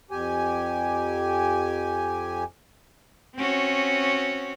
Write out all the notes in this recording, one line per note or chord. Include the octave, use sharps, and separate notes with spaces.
F2 G4 G#5
C4 C#4 F#4